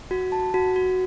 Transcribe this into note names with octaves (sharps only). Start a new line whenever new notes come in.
F#4
A5
F#4
F#4